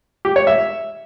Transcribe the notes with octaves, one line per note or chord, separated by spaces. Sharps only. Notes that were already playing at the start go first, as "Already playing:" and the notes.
G4
C#5
E5